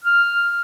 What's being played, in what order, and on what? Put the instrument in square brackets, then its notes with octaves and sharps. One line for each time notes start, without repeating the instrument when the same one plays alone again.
[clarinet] F6